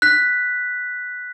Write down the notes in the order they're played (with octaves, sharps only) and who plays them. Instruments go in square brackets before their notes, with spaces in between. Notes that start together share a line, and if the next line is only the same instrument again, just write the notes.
[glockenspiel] F#6 B6